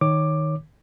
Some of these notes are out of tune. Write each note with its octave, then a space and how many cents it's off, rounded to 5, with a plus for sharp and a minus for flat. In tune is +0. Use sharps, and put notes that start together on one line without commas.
D#3 +0 C#5 +0 D6 +10